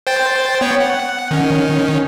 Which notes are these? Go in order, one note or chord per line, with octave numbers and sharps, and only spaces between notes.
C5 G5 A6
B3 C#5 G5
F#5
D#3 C#4